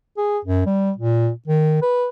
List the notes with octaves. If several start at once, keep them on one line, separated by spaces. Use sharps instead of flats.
G#4
F#2
G3
A#2
D#3
B4